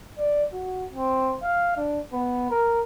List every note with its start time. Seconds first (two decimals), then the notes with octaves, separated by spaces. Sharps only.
0.18 D5
0.53 F#4
0.93 C4
1.42 F5
1.77 D4
2.13 B3
2.50 A#4